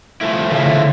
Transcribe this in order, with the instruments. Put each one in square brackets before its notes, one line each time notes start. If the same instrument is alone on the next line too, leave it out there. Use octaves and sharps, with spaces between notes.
[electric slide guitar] F3 A3 E4
[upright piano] C#3 [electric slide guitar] F3 A3 E4
[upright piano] D3